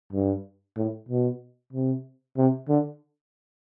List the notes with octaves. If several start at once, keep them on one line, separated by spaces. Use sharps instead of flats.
G2
A2
B2
C3
C3
D3